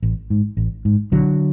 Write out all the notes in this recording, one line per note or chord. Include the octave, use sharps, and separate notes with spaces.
A1
G#2
A1
G#2
B1 D3 F#3